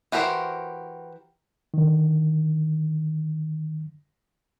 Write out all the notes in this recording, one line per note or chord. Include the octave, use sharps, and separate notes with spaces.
E3 F#4 G4 A#4 C5
D3 D#3